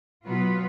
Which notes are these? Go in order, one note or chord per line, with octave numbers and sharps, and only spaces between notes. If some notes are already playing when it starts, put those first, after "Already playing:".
B2 F#3 B3 F4 B4